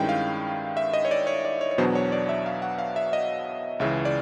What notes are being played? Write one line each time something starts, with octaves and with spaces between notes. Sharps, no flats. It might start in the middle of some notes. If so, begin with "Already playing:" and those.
Already playing: G2 D#3 G#3 C#4 E4 G5
F5
E5
D#5
C#5
D5
C#5
D5
C#5
C#5
E2 B2 F#3 B3 D4 C5
C#5
D5
E5
F5
F#5
F5
E5
D#5
C#2 C#3 E3 E5
D5